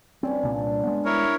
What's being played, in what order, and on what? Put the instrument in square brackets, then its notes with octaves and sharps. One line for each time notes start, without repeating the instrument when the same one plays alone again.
[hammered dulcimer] G2 C#4 D5 [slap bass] C4
[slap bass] C2 A#2 [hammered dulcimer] D4
[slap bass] G#3 B3
[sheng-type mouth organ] E4 A#4 C#5